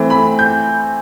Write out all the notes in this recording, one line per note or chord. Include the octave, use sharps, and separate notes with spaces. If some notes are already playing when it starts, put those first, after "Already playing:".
Already playing: E3 A3 C4
B5
G6